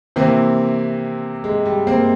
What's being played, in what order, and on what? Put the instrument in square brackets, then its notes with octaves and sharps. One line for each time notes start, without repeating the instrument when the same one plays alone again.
[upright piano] C3 E3 A#3 C4
G#3
G3
A#3 C4